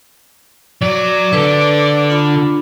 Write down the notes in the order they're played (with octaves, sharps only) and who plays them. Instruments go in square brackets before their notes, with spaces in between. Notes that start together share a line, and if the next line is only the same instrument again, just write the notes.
[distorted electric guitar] F#3 [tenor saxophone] D5
[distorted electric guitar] D3 [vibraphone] B4
[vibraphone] D4 F4 B5